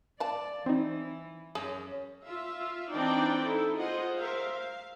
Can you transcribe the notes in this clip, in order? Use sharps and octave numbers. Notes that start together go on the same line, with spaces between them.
D5 F5 A5
E3 C4 D#4
F#2 G#4
F4 E5 F5
E3 C4 D4 D#4 D5 G5
D#4 E4 A4
F4 G#4 C5 D#5 F#5
A#4 C5 E5 F5
F5